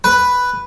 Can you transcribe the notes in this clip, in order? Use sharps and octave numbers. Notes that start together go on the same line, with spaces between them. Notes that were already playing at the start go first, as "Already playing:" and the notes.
B4